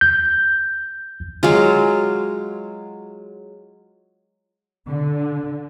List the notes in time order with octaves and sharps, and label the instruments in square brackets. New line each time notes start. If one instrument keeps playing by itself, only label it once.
[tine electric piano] G6
[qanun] F#3 G#3 F4
[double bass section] D3